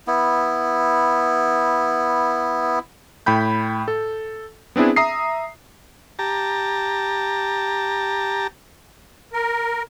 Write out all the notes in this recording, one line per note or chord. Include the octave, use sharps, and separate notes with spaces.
B3 E4
A2 G5 B5 G6
A4
B3 C4 D4 E4 G#4
E5 A#5 D#6 C7
G4 A5 A#5
A#4